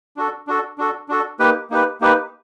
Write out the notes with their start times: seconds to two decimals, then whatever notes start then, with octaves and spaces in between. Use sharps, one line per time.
0.17 D4 F#4 A4
0.47 D4 F#4 A4
0.78 D4 F#4 A4
1.09 D4 F#4 A4
1.39 A#3 D#4 G4 B4
1.70 A#3 D#4 G4 B4
2.01 A#3 D#4 G4 B4